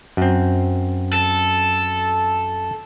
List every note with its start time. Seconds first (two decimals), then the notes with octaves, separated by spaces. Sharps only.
0.17 F#2 C4
1.13 A4